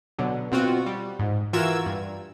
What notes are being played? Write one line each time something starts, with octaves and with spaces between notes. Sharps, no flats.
B2 D3 F#3
B2 C4 F4 F#4
G3
G#2
E3 F4 F#4 A#4 E6 G#6
G2